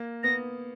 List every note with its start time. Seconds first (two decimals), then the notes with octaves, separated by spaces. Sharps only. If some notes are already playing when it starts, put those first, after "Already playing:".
Already playing: A#3
0.23 B3 A#6